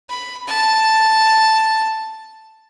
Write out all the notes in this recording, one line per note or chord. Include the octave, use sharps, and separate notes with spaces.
B5
A5